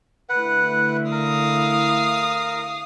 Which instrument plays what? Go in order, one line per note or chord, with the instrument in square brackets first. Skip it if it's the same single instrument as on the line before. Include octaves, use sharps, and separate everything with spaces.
[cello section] D3 A3 E4 [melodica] B4 F#5
[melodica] A#4 [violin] F5 D#6